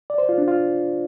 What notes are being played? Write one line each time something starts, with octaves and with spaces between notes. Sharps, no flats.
D5
C5
F4
D4
F4